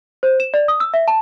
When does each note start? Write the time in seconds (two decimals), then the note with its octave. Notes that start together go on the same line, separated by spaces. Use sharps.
0.23 C5
0.40 E7
0.54 D5
0.68 D#6
0.80 E6
0.94 E5
1.08 A5